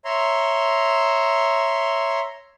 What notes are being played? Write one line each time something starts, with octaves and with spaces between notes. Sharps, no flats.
C#5 E5 A#5 C6